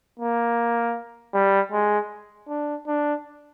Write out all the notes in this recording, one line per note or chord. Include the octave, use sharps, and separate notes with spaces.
A#3
G3
G#3
D4
D4